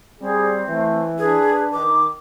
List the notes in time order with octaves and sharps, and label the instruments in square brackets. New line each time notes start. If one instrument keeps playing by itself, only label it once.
[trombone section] G3 [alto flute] C4 [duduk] G#4
[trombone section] E3 [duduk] A3
[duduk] D4 [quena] G#4 [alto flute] B4
[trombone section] D#3 [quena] D6